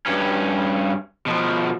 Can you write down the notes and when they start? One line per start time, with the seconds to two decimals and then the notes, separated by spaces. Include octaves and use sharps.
0.06 G2 C#4
1.26 B2 F3